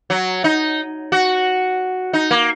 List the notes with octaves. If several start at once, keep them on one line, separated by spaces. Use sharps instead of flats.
F#3
D#4
F#4
D#4
A#3